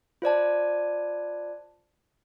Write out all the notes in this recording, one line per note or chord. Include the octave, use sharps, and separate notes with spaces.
F4 C5 D5 A5